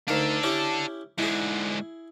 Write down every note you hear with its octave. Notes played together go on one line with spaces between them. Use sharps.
D2 D#3 D4 A4 F5
C#4 E4 G4
G#2 D3 E4 G#4